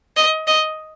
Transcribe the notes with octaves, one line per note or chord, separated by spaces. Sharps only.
D#5
D#5